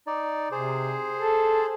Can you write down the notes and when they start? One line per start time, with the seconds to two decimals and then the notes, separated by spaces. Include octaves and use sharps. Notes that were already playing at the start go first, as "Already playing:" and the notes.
0.07 D#4 D5
0.52 C3 G#4 C5
1.20 A4